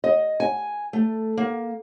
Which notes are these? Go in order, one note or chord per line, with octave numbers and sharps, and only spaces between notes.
D#5
G#5
A3
A#3